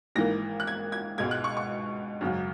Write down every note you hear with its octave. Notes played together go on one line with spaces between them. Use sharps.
G#1 G#2 E3 A#3 A#6
F#6
G#6
G#6
C#2 B2 G#3 G#6
F#6
C#6
C#6
G#1 F#2 C#3 F#3